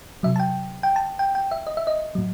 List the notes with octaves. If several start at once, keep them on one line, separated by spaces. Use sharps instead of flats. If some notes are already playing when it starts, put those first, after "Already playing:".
C3 F#3 E5
A5
G5
G5
A5
G5
G5
E5
D#5
E5
D#5
A2 F#3